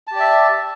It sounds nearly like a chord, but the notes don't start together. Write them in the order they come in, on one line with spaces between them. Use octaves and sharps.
A5 G4 D5 E5